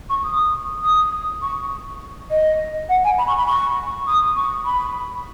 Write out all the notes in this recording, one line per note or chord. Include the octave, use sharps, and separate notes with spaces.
C#6
D#6
D#6
C#6
D#5
F#5
G#5
B5
C#6
B5
C#6
D#6
C#6
B5